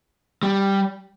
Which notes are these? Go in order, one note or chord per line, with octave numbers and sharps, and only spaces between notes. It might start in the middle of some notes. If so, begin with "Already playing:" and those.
G3